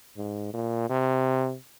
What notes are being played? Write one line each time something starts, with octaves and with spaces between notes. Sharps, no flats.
G#2
A#2
C3